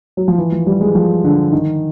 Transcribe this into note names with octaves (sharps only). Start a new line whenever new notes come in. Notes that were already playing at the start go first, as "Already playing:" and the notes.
F#3
F3
E3
F3
G3
G#3
F3
D3
D#3